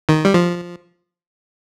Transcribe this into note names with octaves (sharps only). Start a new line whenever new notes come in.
D#3
G3
F3